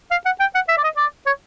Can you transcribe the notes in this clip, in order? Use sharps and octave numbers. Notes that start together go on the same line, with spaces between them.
F5
F#5
G5
F#5
E5
D5
D#5
D5
C#5